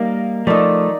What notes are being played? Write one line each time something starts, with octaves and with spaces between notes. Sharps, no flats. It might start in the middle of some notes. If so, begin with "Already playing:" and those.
Already playing: G3 A#3 D#4 A#4 F5
F3 A3 D#4 A#4 D5